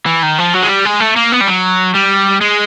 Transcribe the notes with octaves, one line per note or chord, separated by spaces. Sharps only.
E3
D#3
F3
F#3
G#3
G3
G#3
A3
A#3
B3
G3
F#3
G3
G#3